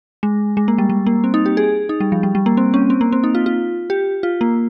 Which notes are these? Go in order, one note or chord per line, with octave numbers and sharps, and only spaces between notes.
G#3
G#3
A#3
G3
G3
A#3
C4
D#4
G4
G#4
D#4
G3
F3
G3
G3
A#3
C4
C#4
C4
A#3
C4
D#4
F4
F4
G4
F4
A#3